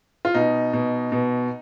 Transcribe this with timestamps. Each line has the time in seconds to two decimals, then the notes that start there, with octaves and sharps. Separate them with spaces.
0.25 F4
0.34 B2 D#4
0.73 B2
1.12 B2